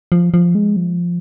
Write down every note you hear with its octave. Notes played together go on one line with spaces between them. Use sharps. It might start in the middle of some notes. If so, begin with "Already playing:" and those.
F3
F3
G#3
F3